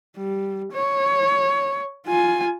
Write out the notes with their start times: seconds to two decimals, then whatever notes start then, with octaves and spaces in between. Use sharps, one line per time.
0.16 G3
0.73 C#5
2.07 F4 G#5